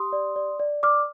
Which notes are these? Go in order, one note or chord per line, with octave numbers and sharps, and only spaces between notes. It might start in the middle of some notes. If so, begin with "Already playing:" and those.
Already playing: G4 C6 D#6
D5
D5
D5
D5 D6 F6